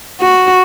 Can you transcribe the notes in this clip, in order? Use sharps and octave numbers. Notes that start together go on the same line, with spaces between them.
F#4